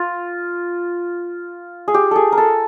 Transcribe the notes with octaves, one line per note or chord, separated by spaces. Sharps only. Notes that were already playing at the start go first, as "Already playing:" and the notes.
Already playing: F4
G#4
G4
G#4 A4
A#4
A4